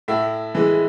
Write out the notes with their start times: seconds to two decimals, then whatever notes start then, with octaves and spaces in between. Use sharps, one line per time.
0.08 A2 E5
0.55 E3 G#3